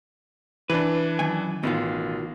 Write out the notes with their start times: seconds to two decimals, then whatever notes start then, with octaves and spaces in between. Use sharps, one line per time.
0.70 E3 D4 B4
1.19 F#2 D#3 G#5
1.63 A1 B2 D#3 F4